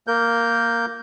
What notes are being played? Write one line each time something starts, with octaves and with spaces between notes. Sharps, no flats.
A#3 A#4 G6